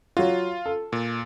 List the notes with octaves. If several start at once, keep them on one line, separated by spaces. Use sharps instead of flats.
F#3 F4 F#4
A4
A#2